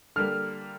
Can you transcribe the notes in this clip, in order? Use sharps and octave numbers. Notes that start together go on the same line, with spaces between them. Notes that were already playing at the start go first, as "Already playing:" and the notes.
D3 G3 A#3 F6